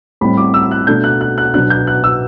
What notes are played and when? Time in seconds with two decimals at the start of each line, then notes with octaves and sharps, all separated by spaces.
0.21 A2 G3 C4 B5
0.37 D6
0.54 E6
0.71 F#6
0.87 B2 A3 D4 G6
1.04 F#6
1.21 F#6
1.38 F#6
1.54 B2 F#3 B3 D4 F#6
1.70 G6
1.87 F#6
2.04 E6